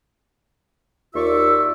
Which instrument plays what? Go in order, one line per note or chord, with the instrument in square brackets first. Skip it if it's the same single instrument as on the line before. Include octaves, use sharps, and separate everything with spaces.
[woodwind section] D#2 F4 D5 E5 C#6 E6